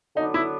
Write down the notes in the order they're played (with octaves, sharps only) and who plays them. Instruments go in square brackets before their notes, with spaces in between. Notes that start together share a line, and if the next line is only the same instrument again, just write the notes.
[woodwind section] D3 F#3 B3 D4 [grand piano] D#4
[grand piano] E4